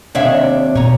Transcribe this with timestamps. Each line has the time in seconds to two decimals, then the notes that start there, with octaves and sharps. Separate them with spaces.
0.15 D#2 C3 D4 C#5 E5 F5
0.75 B2 C#5 A#5